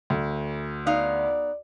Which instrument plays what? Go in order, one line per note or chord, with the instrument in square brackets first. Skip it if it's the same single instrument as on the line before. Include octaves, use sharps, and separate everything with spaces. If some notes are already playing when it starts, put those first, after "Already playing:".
[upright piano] D2
[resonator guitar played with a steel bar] B3 D#4 F5 [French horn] D5